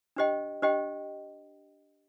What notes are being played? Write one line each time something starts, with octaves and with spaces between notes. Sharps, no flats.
D4 G4 C5 D#5 G5
D4 G4 C5 D#5 G5